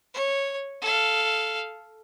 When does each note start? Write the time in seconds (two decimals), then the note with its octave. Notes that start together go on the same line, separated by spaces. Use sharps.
0.14 C#5
0.82 A4 F5